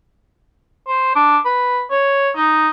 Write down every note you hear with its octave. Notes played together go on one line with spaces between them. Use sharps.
C5
D4
B4
C#5
D#4